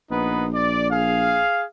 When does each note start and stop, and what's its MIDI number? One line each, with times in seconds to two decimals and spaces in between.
0.10 1.43 34
0.10 0.46 59
0.10 0.46 63
0.10 0.46 71
0.54 0.86 74
0.92 1.65 68
0.92 1.65 77